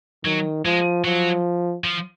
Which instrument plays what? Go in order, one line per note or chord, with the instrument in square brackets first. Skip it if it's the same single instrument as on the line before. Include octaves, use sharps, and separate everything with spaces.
[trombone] D#3 [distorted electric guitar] F#3
[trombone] F3 [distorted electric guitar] G#3
[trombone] F3 [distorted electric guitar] F#3
[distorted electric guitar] F3